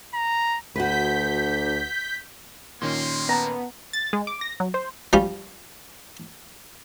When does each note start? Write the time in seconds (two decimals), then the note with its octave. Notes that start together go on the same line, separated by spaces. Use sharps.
0.14 A#5
0.76 D2 F#4 B4 G6 B6
2.82 A#2 D#3 A#3 C#4 C6
3.29 B3 A5 A#5
3.93 A6
4.13 G#3
4.27 D6
4.41 A#6
4.60 F#3
4.74 C5
5.13 F3 G3 C#4